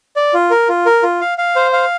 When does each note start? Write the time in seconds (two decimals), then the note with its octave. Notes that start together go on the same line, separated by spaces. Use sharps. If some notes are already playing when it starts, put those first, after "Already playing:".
0.16 D5
0.34 F4
0.51 A#4
0.69 F4
0.86 A#4
1.03 F4
1.21 F5
1.38 F5
1.56 C5
1.73 F5